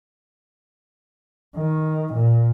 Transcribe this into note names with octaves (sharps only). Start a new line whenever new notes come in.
D#3
A#2